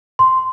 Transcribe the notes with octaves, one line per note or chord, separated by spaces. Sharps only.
C6